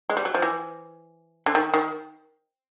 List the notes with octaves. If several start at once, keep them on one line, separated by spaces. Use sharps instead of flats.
G#3
G3
F#3
F3
E3
D3
D#3
D#3